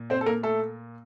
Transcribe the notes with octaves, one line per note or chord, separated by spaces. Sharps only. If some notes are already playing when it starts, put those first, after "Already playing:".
Already playing: A#2
C4 C5
A4
A#3 A#4
A3 A4